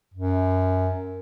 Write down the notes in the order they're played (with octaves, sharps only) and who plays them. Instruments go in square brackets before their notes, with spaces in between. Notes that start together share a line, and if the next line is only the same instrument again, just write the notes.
[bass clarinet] F#2